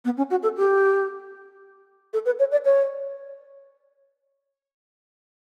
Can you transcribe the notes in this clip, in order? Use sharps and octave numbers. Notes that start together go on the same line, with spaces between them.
B3
C#4
F#4
A4
G4
A4
B4
C#5
D5
C#5